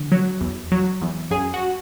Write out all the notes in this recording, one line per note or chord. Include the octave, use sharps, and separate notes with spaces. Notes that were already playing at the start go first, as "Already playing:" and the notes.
Already playing: D3
F#3
E2
F#3
E2
F#2 G#4
F#4